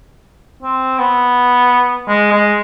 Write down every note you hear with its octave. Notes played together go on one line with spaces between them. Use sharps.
C4
B3
G#3
G#3